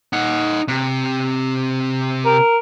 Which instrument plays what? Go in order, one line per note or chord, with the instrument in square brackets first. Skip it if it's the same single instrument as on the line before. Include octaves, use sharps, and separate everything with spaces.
[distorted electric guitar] D#4 F#5
C3
[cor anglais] A#4